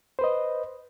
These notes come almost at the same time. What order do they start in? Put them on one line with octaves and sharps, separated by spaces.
C5 B4 D#5